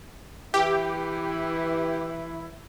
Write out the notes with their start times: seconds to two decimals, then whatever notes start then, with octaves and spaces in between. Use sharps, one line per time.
0.54 E3 E4 G4